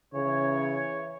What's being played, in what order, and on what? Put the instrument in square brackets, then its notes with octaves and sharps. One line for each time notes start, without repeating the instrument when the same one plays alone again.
[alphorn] C#3 [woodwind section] E3 C#5